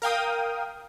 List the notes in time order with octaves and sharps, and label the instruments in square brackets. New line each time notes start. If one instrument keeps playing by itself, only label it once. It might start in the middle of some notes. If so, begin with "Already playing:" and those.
[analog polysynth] A#4 F5 G5 D#6